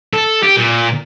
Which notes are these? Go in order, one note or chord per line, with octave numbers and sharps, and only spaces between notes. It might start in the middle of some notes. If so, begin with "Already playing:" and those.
A4
G4
A#2